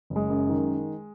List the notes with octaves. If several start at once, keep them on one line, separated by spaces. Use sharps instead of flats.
F#1
G#3
F#2
D#3